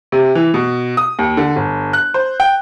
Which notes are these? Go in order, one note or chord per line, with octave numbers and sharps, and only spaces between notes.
C3
E3
B2
D#6
D#2
D3
G1
F#6
C5
G5